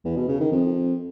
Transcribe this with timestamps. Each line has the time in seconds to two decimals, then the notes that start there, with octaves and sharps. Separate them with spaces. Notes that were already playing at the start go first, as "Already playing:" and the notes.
0.05 E2
0.16 B2
0.28 C#3
0.40 D#3
0.52 F2